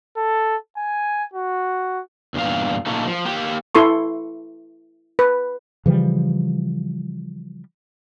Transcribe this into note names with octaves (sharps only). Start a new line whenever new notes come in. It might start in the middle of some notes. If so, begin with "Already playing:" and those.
A4
G#5
F#4
E2 G2 A#2 F5
A#2 C#3 A3 A#3 D#4
F3
A#3 G4
E4 A4 C6 C#6
B4
C#3 E3 F3 G3